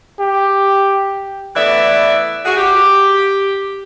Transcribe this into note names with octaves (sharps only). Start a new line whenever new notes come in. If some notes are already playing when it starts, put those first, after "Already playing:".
G4
E3 A3 B3 D5 E5
F#4 G#4
G4